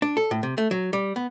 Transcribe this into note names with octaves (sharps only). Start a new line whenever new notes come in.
D4
A4
A2
C3
A3
F#3
G3
B3